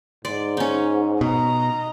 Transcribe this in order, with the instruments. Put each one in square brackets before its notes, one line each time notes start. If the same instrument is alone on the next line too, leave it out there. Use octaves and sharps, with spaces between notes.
[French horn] G#2 [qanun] D5 C6
[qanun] C#4 D#4
[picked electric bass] B2 [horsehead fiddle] D#5 A#5